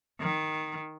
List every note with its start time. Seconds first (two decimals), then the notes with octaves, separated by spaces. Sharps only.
0.20 D#3